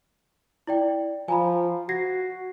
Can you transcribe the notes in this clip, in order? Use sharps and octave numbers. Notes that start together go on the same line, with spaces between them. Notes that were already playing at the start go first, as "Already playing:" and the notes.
E4 D5 G5
F3 G#5 A#5 B5
F#4 G#6 A#6 C7